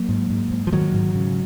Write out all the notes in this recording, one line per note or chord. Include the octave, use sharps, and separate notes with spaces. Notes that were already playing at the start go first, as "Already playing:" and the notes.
Already playing: F#3 A#3
G#2
G#2
G#2
F3
G#2 D#3 F#3
G#2
C#3